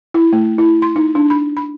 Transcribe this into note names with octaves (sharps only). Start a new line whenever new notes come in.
E4
A3
E4
C6
D#4
D4
B5
B5